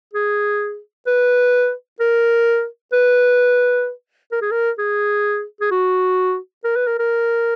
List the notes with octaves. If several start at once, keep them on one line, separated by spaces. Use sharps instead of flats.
G#4
B4
A#4
B4
A#4
G#4
A#4
G#4
G#4
F#4
A#4
B4
A#4
A#4